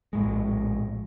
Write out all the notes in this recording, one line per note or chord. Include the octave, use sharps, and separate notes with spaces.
A#1 A2 G#3